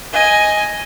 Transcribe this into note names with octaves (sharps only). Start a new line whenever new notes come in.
D#5 G#5